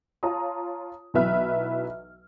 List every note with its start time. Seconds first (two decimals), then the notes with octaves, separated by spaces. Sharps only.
0.23 F4 C#5 A5 A#5 D#6
1.14 B1 E3 F#3 B4 E5 F6